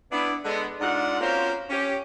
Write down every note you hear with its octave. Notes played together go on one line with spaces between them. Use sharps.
B3 D4 E4
D3 G#3 B3
G#2 D4 F4 F#5
A#3 C4 C#4 F4 F#4 C5
C#4 G4